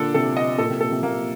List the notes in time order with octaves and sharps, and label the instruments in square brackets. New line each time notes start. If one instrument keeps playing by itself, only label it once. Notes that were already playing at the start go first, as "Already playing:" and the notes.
Already playing: [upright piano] A#2 D3 [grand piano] D4 A4
[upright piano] C3 [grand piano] A4
[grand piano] D#5
[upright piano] A#2 [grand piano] A4
[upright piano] C3
[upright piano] A#2 [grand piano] A4
[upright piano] C3
[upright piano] C3 [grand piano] A#3